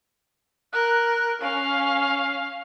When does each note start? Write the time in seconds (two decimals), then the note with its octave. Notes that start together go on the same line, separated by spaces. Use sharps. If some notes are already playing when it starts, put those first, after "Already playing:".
0.73 A#4 F#6
1.41 C#4 F5